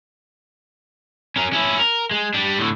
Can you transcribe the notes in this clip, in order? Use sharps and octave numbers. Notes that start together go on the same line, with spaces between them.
C#4 A#4
C#4 E4
A#4
G#3
G3 D4
A2 D3